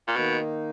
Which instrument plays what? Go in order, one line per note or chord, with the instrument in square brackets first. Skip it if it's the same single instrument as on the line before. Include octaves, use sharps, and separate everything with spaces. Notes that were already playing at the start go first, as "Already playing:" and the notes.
[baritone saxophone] A#2
[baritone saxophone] B2 [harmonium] D#3 A#3 D#4